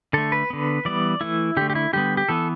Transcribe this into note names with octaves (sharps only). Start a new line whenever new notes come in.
D3 A3 A4
B4
D3 B3
E3 G3 B3 D5
E3 A3 E4
D3 A3 G4
G4
E4
D3 G3 B3 G4
G4
E3 B3 A4